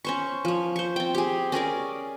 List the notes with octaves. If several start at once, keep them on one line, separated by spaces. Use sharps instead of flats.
C#4 C5 C#6
F3 C#5
C5 C#6
C4 G5
G4 G#4
C#4 G#4 A#4 D5